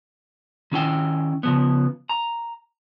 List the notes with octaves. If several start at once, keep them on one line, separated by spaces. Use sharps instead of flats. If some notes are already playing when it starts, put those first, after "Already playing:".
D#3 C#4 E4 G5
C#3 F3 B3
A#5